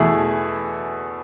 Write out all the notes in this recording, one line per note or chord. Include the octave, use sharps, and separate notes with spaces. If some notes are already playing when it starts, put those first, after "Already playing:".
Already playing: E2 B2 A3 E4 G#4